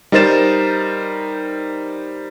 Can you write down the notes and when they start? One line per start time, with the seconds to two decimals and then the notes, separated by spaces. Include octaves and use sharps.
0.12 G3 D#4 A#4 C5 A6 E7